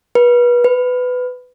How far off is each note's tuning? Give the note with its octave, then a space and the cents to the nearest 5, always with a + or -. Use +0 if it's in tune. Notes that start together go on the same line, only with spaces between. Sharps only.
B4 -30
B4 +15